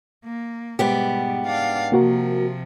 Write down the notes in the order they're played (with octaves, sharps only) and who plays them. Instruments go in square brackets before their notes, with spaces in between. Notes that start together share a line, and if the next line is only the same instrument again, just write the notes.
[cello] A#3
[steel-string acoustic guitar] G#2 B3 G4 [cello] B2 G3
[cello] D4 F5
[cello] C3 F3 [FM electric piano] A#3 F#4 A#4